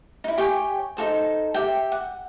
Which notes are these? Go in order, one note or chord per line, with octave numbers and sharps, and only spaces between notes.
D#4 E4
G4 C#5 G5 G#5
D#4 F#4 A4 C5
G4 E5 G5
F#5